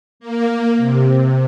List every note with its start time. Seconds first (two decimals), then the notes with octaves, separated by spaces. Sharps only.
0.20 A#3
0.77 C3